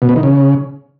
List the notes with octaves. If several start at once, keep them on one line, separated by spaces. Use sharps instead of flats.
B2
B3
D#3
C#3